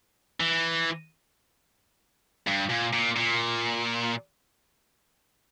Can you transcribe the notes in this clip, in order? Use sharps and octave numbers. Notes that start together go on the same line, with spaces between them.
E3
G2
A#2
A#2
A#2